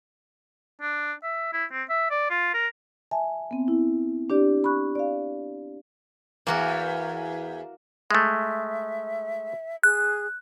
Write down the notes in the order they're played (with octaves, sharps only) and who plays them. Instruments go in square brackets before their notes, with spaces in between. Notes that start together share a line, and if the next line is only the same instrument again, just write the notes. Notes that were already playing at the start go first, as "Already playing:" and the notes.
[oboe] D4
E5
E4
C4
E5
D5
F4
A#4
[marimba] E5 G#5 A5
B3 C4
E4
D4 G4 D5
B5 C#6 F#6
D5 F5
[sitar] E2 [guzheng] A#3 F#4 A#4
[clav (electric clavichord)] G#3 A3 [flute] E5
[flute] G#4 [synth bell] F#6